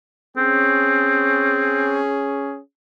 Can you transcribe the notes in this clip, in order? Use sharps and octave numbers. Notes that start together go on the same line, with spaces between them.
C4 C#4 G#4